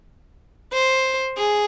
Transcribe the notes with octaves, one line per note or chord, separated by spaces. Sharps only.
C5
G#4